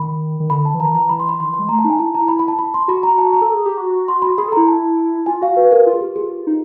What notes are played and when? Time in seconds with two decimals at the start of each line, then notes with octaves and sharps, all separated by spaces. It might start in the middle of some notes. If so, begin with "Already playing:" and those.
Already playing: D#3 B5
0.40 D#3
0.50 D3 B5
0.65 A5
0.74 E3
0.80 D#3 A#5
0.94 E3 A#5
1.09 E3 B5
1.20 C6
1.29 B5
1.40 D#3 C6
1.49 E3
1.54 C6
1.59 G#3
1.69 A3 A#5
1.79 A5
1.85 D#4
1.90 G#5
1.99 E4 A5
2.14 A#5
2.28 B5
2.39 B5
2.48 A5
2.59 B5
2.74 C6
2.88 F#4 B5
3.03 A#5
3.18 A5
3.33 A#5
3.42 A4
3.54 G#4
3.66 G4
3.77 F#4
4.08 C6
4.22 B5
4.38 G#4 B5
4.48 A4
4.52 A#5
4.57 E4
4.67 A5
5.26 F4 G#5
5.42 F#4 F5
5.57 B4
5.72 A#4
5.86 F4
5.93 G#4
6.01 G4
6.16 G#4
6.47 D#4